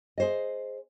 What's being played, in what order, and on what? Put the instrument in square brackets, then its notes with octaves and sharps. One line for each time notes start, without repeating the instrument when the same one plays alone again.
[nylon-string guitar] G#4 C5 D#5